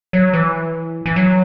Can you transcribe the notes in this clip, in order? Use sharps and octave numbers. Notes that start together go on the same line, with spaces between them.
F#3
E3
E3
F#3